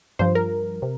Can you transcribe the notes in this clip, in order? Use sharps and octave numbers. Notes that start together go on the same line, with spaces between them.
G2 F3 C5
A#4
C3